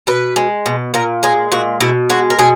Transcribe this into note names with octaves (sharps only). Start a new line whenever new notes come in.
B2 B4
G#3
B2
A#2 A#4
G#3 G#4
A#2 F#4
B2 E4
G#3 F#4
A#4
B2 G#4